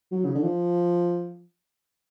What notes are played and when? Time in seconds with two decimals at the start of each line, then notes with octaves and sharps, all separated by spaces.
0.11 F#3
0.26 C#3
0.35 D3
0.43 F3